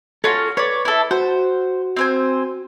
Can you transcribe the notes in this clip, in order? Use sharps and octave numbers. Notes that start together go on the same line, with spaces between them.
C#4 F4 F#4 A4
B4 C#5 D5
E4 A4
F#4 C5
C4 C5 G#5